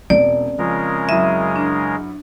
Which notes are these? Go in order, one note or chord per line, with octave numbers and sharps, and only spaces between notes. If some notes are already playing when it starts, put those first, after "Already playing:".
E1 C4 C#4 D5
C#3 F3 G#3 A#4
F#2 E4 E5 D#7
D4